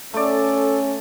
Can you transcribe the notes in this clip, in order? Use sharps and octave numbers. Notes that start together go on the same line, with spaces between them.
A3 C#4 A4 D5